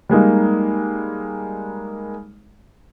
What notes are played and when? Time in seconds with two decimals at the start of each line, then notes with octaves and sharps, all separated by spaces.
0.09 G3 G#3 A#3 D#4